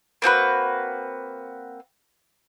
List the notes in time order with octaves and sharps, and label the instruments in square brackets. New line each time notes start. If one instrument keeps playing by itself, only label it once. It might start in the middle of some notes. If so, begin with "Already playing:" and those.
[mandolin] A#3 C4 F#4 B4